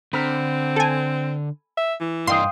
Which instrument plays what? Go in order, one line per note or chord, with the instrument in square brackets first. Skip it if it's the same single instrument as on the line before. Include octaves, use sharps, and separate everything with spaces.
[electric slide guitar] D3 [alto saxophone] C4 [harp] B5 F6 B6
[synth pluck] A4 G#5
[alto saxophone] E5
E3
[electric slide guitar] G2 D4 D#5 [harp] F5 G5 D#6 [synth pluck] C6